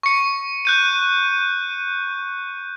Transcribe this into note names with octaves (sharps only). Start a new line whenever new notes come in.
C#6 C#7
F#6 G6 D#7